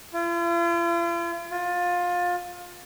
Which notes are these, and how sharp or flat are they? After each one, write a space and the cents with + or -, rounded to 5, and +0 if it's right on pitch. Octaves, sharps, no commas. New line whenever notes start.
F4 -45
F4 +20